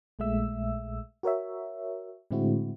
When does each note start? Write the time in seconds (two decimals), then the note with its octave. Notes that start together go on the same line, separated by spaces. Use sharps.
0.19 A#1 A#2 G#3 A3 E5 E6
1.23 F#4 A#4 C#5 E5
2.31 A2 D3 G#3 C4 E4 F#4